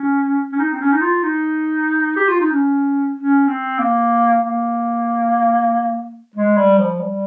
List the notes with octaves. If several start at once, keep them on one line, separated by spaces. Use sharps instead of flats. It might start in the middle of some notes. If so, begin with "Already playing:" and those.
Already playing: C#4
C#4
D#4
C4
C#4
D#4
F4
D#4
G4
F4
D#4
C#4
C#4
C4
A#3
A#3
G#3
G3
F3
G3